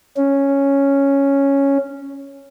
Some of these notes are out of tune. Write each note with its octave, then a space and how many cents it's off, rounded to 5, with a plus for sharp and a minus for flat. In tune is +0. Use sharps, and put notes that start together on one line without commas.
C#4 +0